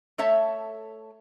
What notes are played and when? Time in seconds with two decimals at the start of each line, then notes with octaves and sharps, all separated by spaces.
0.18 A3 A4 C#5 E5 A5